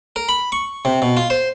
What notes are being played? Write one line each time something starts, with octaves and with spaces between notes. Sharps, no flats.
A#4
B5
C#6
C3
B2
F4
C5